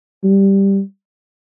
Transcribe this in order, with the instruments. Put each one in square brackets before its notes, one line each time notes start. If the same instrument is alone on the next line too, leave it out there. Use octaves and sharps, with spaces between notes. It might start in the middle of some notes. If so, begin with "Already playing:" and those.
[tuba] G3